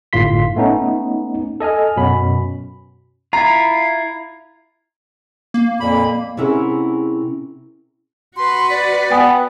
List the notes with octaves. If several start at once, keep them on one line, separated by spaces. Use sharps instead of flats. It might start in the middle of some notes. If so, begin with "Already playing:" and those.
G1 A2 F4 C6 B6
A3 B3 C#4 D#4
A4 D#5 G#5 F6
F#2 B2 C#4 B5
E4 F4 A#5
A#3
F2 A#2 B5
C3 C#4 E4 G#4 A#4 F#5
F#4 B4 C6
D5
B3 G5 G#5 D#6